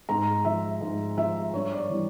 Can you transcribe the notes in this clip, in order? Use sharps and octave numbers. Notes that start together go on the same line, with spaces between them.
G#2 A#5
F3 E5
G#2
F3 E5
G2 C#5
D5
C#5
E3 G3